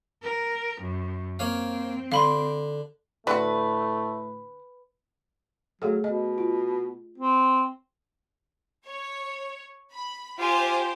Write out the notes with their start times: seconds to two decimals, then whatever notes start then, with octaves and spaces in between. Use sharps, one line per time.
0.22 A#4
0.81 F#2
1.39 A#3 C4 C#5 F5
2.12 D3 F5 B5 C6
3.27 A2 D3 A3 F#4 B4
5.82 F#3 A3 G#4 A4
6.04 B2 D#5
6.38 F4
7.18 C4
8.86 C#5
9.93 B5
10.39 F4 G4 C5 G#5